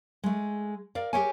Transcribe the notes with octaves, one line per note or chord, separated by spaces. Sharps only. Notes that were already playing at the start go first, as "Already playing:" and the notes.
G#3 A3
A#4 D5 F5
G4 G#4 A#4 C#5 E5 G#5